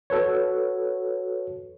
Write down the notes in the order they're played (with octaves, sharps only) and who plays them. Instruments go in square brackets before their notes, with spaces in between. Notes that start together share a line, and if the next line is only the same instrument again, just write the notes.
[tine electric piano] F#4 A4 B4 C#5